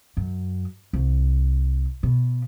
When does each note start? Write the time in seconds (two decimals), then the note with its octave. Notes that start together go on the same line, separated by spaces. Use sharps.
0.17 F#2
0.93 C2
2.03 B2